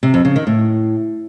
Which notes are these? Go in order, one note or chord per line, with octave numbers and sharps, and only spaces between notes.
C3
F2
C#3
D#3
A2